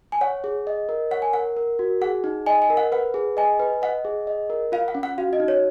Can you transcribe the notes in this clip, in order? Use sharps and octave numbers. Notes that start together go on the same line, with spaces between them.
G#5
C#5 F#5
G#4
D#5
A#4
C#5 F#5
G#5
A#4 F#5
A#4
F#4
G#4 F#5
D#4
D#5 G#5
G#5
A#4
F#5
B4 F#5
G#4
D#5 G#5
B4
D#5 F#5
G#4
D#5
A#4
F4 F5
F#5
C#4
F#5
F#4 F5
D#5
D#4
C#5